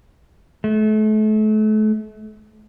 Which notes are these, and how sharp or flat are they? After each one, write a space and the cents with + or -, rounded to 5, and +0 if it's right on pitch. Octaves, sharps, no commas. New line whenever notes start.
A3 -35